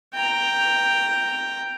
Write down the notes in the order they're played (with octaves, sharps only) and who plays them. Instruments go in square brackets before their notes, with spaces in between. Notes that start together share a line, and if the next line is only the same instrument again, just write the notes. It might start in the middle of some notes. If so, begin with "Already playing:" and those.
[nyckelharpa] G5 A#5